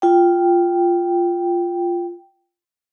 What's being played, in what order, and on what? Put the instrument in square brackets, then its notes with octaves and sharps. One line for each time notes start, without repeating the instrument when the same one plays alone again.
[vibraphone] F4 G5